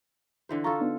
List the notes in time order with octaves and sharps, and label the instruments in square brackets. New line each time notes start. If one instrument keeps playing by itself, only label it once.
[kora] D3 E3 C5
[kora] F4 A4 [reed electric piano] A#5 C#6
[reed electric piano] B3 D4 D#4